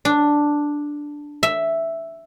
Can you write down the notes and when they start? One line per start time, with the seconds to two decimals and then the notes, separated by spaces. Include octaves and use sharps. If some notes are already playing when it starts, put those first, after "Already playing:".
0.05 D4
1.43 E5